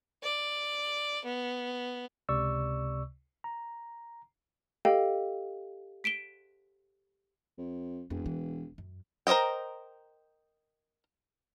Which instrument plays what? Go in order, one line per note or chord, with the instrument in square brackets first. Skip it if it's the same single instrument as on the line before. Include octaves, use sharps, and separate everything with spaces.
[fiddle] D5
B3
[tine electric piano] C#2 C3 D5 C#6 E6
A#5
[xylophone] G4 A4 D#5 F5 G5
B6 D7 E7 G7
[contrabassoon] F2
[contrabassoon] E1 [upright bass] F2
[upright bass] E3
F#2
[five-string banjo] A#4 C5 C#5 D#5 G5